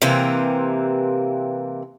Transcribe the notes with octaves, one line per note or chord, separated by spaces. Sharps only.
C3 E3 A#3 C4